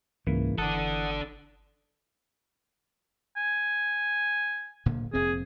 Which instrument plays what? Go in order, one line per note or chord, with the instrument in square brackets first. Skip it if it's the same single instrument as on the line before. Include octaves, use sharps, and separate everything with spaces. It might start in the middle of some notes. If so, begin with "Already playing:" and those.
[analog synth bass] C#2 [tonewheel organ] G#2 C#3 A#3 [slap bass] E3
[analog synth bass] G1 [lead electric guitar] D4 A4 [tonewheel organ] F#5 D#6
[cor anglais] G#5
[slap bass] D1 A#2 D3
[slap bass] F1 A#2 C4 [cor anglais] G#4